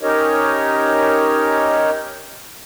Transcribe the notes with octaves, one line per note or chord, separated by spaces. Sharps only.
C#4 D#4 G4 A#4 C#5 D#5